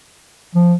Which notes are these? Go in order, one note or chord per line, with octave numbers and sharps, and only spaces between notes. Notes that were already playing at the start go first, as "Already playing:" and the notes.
F3